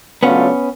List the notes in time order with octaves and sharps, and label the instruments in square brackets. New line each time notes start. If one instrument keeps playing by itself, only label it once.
[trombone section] C#3 F#3 A3 D4 F4 [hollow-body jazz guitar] B3 C#4